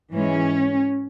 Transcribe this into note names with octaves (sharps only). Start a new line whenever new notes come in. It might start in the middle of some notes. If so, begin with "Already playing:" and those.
G#2 E3 G#3 C#4